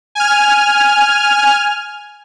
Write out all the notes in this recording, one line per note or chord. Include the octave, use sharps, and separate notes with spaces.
G#5 F6